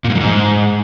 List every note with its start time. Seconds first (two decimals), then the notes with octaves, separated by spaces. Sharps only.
0.04 A#2
0.10 G#2
0.15 F#2
0.20 G#2